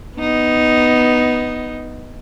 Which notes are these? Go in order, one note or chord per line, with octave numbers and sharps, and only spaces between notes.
B3 D#4